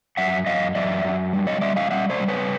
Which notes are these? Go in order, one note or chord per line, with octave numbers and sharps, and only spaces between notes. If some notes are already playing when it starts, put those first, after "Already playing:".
F#2 E5 F#5
F#2 D#5 F5
F#2 D5 E5
F#2
G3
C#5 D#5
G3 D5 E5
D#5 F5
G3 E5 F#5
C5 D5
G3
B4 C#5